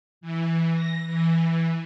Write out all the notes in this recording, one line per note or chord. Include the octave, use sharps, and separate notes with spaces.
E3
A#6
E3